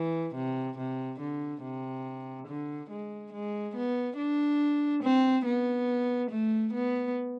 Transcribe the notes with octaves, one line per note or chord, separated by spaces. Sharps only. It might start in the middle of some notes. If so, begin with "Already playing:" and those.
Already playing: E3
C3
C3
D3
C3
D3
G#3
G#3
B3
D4
C4
B3
A3
B3